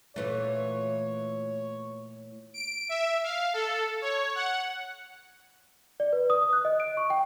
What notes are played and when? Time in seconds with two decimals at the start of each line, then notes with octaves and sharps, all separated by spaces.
0.16 A#2 E3 A3 C#5
2.54 D7
2.89 E5
3.24 F5
3.54 A4
4.02 C#5
4.35 F#5
6.00 D5
6.13 B4
6.30 D#6
6.53 F#6
6.65 D#5
6.80 D7
6.97 C#6
7.10 G5